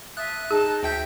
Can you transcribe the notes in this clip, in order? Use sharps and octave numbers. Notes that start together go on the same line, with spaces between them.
E5 F5 A5 D#6 F#6
D#4 G#4 A5
D2 E5 G5 G6